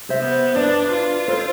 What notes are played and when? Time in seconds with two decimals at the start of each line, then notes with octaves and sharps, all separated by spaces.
0.10 C5 E5
0.20 B3
0.55 D4 B4 D5
0.92 F4
1.28 A4 C5